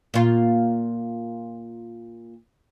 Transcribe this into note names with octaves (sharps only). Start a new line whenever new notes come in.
A#2 F4